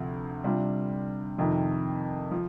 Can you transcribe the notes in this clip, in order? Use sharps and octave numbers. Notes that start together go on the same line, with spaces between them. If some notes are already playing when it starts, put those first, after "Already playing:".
Already playing: D2 C3 F3
C3 G3 D4 F4
F2 C3 D#3
F3